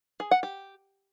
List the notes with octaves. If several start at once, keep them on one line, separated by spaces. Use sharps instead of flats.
G#4
F#5
G4